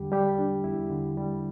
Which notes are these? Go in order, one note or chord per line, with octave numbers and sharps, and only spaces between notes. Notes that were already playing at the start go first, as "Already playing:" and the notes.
Already playing: E2 D3 G3 G4
G3 G4
D4
E2 E4
D3
G3